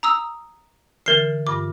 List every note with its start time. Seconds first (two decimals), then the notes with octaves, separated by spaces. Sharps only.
0.03 A#5 D#6 E6
1.06 D3 E3 A#4 A6 C7
1.47 G2 F4 D6